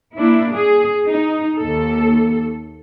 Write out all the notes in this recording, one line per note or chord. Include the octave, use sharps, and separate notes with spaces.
A#3 D4 E4
G#4
D#4
D#2 A4